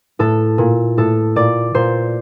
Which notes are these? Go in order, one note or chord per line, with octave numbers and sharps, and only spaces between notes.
A2 A4
A#2
A2 A4
A#2 D5
A#2 C5